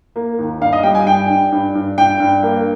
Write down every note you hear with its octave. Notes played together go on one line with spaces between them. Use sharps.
A#3
D#2
G2 F5
D#5
G3 G5
G#5
G2 G5
G2
G2
G2
G2 G5
G2
A#3